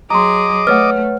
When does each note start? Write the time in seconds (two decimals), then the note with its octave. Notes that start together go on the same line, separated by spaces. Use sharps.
0.10 F#3 G#4 D#5 A#5 C6 D6
0.67 A3 B4 C#5 F#5 F6